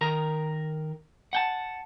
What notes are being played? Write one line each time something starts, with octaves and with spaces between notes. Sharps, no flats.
D#3 A#4 A#5
F#5 G5 A5